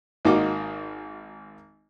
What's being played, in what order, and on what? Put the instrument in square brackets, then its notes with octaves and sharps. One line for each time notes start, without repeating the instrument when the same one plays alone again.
[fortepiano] G#1 A#3 D#4 F#4 D#5 D6